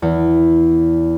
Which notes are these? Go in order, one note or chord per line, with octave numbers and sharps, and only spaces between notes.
E2